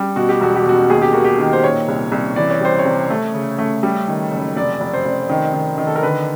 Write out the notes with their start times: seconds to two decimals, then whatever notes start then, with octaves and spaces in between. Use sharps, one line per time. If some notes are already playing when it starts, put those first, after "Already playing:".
Already playing: G3
0.16 B2 F#4
0.29 G4
0.41 E1 F#4
0.56 G4
0.65 B2 F#4
0.90 D#2 G#4
1.02 G4
1.13 A#3 F#4
1.24 G4
1.39 D#3
1.53 C5
1.64 A#2 C#5
1.88 C2
2.12 C2
2.36 E3 D5
2.51 C#5
2.61 G3 C5
2.79 C#5
2.85 C3
3.10 A3
3.34 C#3
3.58 A3
3.83 G3
4.08 D#3
4.32 F#1
4.56 F1 D5
4.81 F1
4.93 C5
5.05 F1
5.30 D#3
5.54 D#3
5.78 D#3
5.87 A4
5.96 A#4
6.02 D3 B4